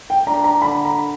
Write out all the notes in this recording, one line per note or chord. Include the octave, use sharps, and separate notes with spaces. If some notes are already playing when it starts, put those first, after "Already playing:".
G5
D4 A#5
A#5
D3 B5
A#5